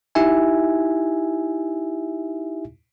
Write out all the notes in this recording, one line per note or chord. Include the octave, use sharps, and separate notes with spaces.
D#4 E4 G4 E5 G#5